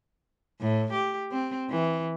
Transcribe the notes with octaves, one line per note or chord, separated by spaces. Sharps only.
A2
G4
C4
E3